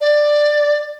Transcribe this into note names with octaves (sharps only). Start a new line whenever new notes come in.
D5